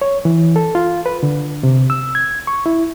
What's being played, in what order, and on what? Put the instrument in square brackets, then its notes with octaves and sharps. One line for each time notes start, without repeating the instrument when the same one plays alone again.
[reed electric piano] C#5
E3
A4
F4
B4
D3
C3
E6
G#6
C#6
E4